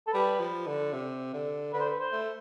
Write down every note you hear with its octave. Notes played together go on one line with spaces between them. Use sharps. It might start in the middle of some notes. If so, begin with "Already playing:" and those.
A4
G3 B4
F3
D3
C3
D3
D3 B4
C5
B4
C5
A3